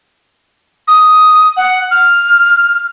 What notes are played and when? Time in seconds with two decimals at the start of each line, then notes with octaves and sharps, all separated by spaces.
0.88 D#6
1.57 F#5
1.91 F6